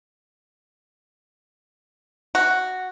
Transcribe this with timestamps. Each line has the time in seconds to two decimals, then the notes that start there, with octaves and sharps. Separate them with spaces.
2.35 F#4